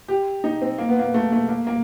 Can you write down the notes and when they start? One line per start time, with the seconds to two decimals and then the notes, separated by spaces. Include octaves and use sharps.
0.08 G4
0.44 D#4
0.62 C4
0.78 A#3
0.89 B3
0.99 A#3
1.14 A3
1.32 A3
1.48 A#3
1.67 A#3